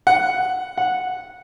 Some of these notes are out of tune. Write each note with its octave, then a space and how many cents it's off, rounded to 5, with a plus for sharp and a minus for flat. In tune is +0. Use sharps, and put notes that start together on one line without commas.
F#5 +0
F#5 -10